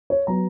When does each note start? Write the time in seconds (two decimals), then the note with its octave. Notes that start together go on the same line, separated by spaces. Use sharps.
0.10 C#5
0.27 F#3 B3 A#5